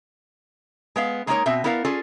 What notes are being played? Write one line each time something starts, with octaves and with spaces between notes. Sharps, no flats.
G#3 B3 F5
G#3 A#3 B3 D#4 A#4 C#5
B2 C4 E5
B3 E4 A#4 D5 F5
C#4 F4 G#4 A4 D5